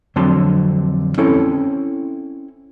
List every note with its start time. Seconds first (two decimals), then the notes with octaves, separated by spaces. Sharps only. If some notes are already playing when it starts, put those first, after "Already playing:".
0.16 F2 D3 F#3 C4 A5 C6
1.18 C4 C#4 E4 A4